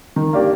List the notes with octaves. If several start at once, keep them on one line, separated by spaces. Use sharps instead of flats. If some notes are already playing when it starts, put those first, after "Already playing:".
D#3
A#3 D4 G4 D5